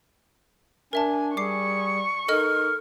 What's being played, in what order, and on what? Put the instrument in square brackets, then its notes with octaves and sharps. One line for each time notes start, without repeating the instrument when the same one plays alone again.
[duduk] D4 [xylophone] A#4 E5 A5 [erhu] G#5
[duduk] G3 [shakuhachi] G#4 [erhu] C#6 [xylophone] D6 C7
[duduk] D#4 [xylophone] A4 D#5 F6 [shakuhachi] A#4